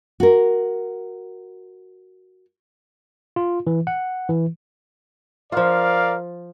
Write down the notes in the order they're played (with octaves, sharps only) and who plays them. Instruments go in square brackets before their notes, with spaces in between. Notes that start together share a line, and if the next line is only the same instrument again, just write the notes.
[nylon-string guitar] F#4 A#4
[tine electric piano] F4
E3
F#5
E3
[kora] F3 F4 [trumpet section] A#4 D5 F5